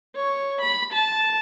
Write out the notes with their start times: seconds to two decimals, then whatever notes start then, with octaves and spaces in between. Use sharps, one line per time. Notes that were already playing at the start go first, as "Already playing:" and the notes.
0.16 C#5
0.62 B5
0.93 A5